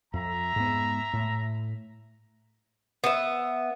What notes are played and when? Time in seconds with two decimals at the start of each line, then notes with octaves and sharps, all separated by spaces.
0.14 F2 E5 A#5
0.56 G#2 B3
1.13 A2
3.04 B3 E5